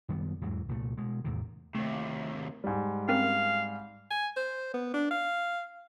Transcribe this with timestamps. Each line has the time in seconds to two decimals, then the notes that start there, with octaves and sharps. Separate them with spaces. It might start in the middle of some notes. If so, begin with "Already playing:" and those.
0.09 F#2 D#3 G3 B3
0.41 E2 G#2 E3 F#3
0.69 C2 A#2 A3
0.97 B2 G#3
1.24 E2 A2 C3 D#3
1.75 D#2 C3 A3
2.64 G#2 G3
3.09 C4 C#4 A#4 F5
4.10 G#5
4.36 C5
4.74 B3
4.94 D4
5.11 F5